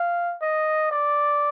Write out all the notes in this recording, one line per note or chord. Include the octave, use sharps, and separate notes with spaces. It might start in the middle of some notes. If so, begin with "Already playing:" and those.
Already playing: F5
D#5
D5